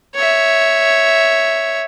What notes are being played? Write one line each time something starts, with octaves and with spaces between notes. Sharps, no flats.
C#5 E5